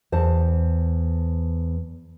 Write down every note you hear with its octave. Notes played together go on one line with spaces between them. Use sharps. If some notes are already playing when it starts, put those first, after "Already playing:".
E2 C5 A5